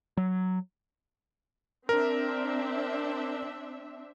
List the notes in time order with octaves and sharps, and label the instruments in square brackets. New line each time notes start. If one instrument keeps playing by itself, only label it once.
[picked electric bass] F#3
[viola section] C4 D4 E5 [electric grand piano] A#4